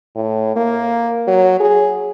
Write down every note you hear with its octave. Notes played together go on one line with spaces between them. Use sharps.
A2
A#3
F#3
G#4